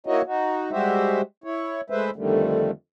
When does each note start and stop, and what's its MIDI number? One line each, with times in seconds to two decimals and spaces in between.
0.07 0.22 58
0.07 0.22 63
0.07 0.22 64
0.07 0.22 66
0.07 0.22 73
0.07 0.22 75
0.26 0.71 63
0.26 0.71 66
0.71 1.22 55
0.71 1.22 56
0.71 1.22 66
0.71 1.22 67
0.71 1.22 72
0.71 1.22 76
1.44 1.81 64
1.44 1.81 73
1.90 2.10 56
1.90 2.10 57
1.90 2.10 71
1.90 2.10 72
1.90 2.10 76
2.16 2.71 41
2.16 2.71 50
2.16 2.71 51
2.16 2.71 55
2.16 2.71 57